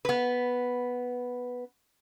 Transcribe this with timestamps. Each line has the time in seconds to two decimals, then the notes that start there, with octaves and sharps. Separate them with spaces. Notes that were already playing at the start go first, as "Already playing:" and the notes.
0.05 B3 B4